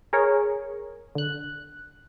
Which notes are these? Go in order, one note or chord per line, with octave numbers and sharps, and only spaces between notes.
G#4 A#4 C#5
D3 F#6